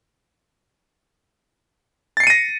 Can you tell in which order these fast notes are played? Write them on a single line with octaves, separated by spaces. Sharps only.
A6 C7 C#7 D#7 A#6